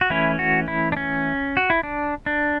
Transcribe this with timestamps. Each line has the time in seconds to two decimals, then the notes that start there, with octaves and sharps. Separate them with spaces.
0.01 F#4
0.10 E3 A3 C#4 E4
0.39 F#4
0.68 E4
0.92 D4
0.97 C#4
1.57 F#4
1.70 E4
1.83 D4
2.26 D4